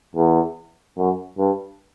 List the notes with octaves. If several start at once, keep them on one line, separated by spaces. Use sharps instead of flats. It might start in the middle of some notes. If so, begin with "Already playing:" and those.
E2
F#2
G2